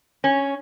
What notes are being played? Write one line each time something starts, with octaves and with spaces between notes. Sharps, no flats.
C#4